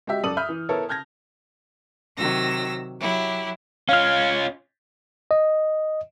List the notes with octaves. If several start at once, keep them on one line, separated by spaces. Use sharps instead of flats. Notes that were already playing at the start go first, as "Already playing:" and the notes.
G#3 F#4 G4 E5
F#2 A4 D5 D#6 D#7 F#7
E5 B5 F6 G6
E3
B3 E4 A4 A#4 C#5
A5 F6 G6 G#6 A#6
C3 D#3 F#3 E6 A#6
F#3 E4 G4
C#4 F4 F5 F6
D#5